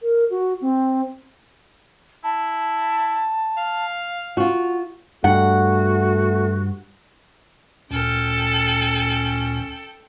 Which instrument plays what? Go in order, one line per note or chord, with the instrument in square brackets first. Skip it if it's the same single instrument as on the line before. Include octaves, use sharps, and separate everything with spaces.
[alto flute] A#4
F#4
C4
[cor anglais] E4 [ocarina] A5
[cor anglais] F5
[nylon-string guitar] F4 F#4
[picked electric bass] G2 [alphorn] A3 [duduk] F#4 [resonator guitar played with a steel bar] F#5
[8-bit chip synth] D2 A#2 [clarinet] C#4 [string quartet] A4 G5